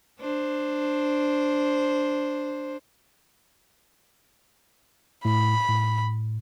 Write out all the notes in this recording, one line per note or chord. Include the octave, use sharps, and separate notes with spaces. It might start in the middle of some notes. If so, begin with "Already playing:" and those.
D4 C5
A2 B5
A2